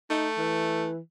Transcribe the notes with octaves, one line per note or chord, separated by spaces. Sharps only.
A3 D#4
E3